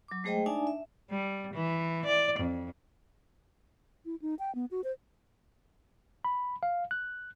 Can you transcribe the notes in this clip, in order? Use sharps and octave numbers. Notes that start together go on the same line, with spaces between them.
F#3 D6
G#3 A3 G#4 C5 D#5 G5
D4 D#4 D5 E5 G#5 A5
E5
G3
E3
D5
F2
E4
D#4
G5
B3
F#4
C5
B5
F5
F#6